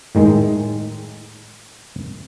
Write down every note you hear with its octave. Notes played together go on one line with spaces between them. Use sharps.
A2 D#3 G#3